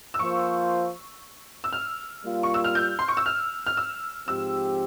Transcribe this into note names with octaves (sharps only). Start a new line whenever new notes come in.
E6
F3 A#3 F4 C5 C#6
E6
F6
G3 A#3 F4
C#6
E6
F6
G6
C6
C#6
E6
F6
F6
E6
G#2 F3 C4 G4 E6